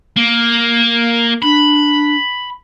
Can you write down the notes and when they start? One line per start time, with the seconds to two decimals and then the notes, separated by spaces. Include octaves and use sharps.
0.16 A#3
1.42 D4 B5